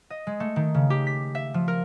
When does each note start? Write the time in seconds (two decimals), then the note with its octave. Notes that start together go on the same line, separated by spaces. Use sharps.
0.10 D#5
0.27 G#3
0.40 A3
0.56 D#3
0.74 C#3
0.90 G4
1.07 B6
1.35 E5
1.54 F3
1.68 A#4